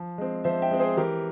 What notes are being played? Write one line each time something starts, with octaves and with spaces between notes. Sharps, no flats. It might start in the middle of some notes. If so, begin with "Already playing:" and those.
Already playing: F3
G#3 C4
F3 C5 E5
E5 G5
G#3 C4
G#4 C5
E3 G4 A#4